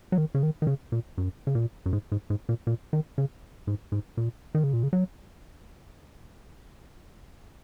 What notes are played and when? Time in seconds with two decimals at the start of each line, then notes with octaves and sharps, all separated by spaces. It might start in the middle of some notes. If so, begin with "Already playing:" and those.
0.12 F#3
0.18 D#3
0.35 C#3
0.43 D#3
0.62 D#3
0.67 C#3
0.92 A#2
1.18 F#2
1.47 C#3
1.55 A#2
1.86 F#2
1.93 G#2
2.12 G#2
2.30 G#2
2.49 A#2
2.67 A#2
2.93 D#3
3.18 C#3
3.67 G#2
3.92 G#2
4.17 A#2
4.55 D#3
4.64 C#3
4.73 A#2
4.83 C#3
4.93 F#3